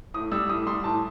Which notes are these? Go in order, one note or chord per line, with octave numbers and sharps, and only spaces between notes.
A2 D#6
G3 E6
A2 D#6
G3 C6
A2 A5